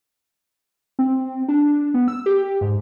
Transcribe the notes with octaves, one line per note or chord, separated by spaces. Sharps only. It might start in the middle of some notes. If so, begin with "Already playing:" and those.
C4
D4
B3
E6
G4
G#2